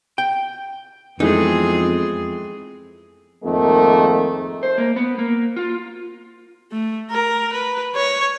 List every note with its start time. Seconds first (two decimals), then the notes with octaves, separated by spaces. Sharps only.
0.18 G5
1.20 F2 E3 G#3 A3 B3 C4 D#4 G#4
3.44 F2 G#2 D#3 A3 A#3
4.63 C5
4.78 A#3
4.96 B3
5.19 A#3
5.56 F4
6.72 A3
7.10 A#4
7.53 B4
7.95 C#5